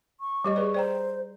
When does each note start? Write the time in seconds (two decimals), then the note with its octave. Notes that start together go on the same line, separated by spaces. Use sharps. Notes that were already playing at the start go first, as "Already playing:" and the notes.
0.20 C#6
0.44 G3 G4 D#5
0.56 G#4 B4 D5
0.74 C5 D5 G5 A#5